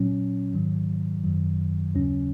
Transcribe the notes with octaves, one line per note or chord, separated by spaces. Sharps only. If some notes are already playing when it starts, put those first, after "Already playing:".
Already playing: A#2 F#3 C#4
G#2 D#3 F#3
F#2 D#3 F#3
D#2 C#3 F#3 C#4